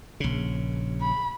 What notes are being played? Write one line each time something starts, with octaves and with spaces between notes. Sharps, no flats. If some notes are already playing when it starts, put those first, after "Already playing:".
A#1 C#3
B5